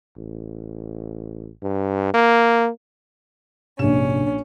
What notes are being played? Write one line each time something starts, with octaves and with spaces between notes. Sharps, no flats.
A1
G2
A#3
A#1 G#2 C3 C#4 D4 E7